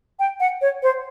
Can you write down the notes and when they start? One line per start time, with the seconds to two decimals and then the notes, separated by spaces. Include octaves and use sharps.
0.19 G5
0.40 F#5
0.62 C#5
0.83 C5